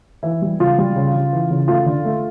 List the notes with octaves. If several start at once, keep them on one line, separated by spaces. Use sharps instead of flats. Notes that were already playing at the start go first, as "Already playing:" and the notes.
E3 E4
G3
C#3 F4
G3
C#3
C#3
E3
C#3
A3 F4
D3
A3